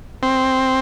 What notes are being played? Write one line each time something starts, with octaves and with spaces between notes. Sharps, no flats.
C4